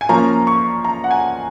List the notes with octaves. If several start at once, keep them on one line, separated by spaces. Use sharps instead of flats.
G#5
F3 A#3 C#4 A#5
C#6
A#5
F#5
G#5